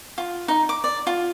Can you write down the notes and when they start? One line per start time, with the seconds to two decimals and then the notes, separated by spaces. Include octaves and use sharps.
0.18 F4
0.48 D#4
0.69 D6
0.84 D5
1.07 F4